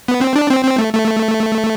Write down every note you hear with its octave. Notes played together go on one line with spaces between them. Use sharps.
B3
C4
D4
C4
C4
A3
A3